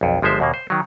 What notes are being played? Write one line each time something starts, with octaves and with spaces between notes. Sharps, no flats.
B1 F2
G1 F3 G#3 C5 E5
D#2 B2 A#3
C5
D#3 F#3